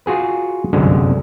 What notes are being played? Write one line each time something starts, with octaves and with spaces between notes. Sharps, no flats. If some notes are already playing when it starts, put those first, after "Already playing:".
F4 F#4 G#4 B4
G1 C2 F#2 D3 G#3